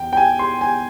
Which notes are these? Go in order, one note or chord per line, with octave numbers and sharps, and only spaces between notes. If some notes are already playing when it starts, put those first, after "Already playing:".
Already playing: E2 G5
G5
G#5
C6
G#5